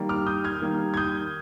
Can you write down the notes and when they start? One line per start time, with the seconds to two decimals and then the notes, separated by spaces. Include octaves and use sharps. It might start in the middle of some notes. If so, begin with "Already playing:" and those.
Already playing: D#3 G3 A#3
0.09 D6 F6
0.27 D#6 G6
0.44 F6 G#6
0.62 D#3 G3 A#3
0.94 G#6
0.97 D#6 G6